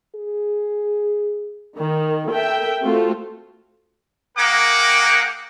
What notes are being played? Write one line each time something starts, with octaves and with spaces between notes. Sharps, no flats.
G#4
D#3
A4 A#4 E5 G5
A3 C4 F4 F#4 A4
A#3 G#4 A#4 F#5 G5 D6